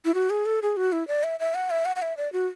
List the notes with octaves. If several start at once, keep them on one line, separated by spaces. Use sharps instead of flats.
E4
F#4
G#4
A4
G#4
F#4
E4
D5
E5
E5
F#5
E5
F#5
F#5
E5
D5
F#4